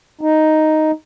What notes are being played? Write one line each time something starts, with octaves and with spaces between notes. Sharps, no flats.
D#4